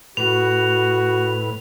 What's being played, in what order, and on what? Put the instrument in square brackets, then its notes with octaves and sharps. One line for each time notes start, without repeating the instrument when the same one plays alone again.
[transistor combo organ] A2 B4 [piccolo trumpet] F#4 [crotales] F7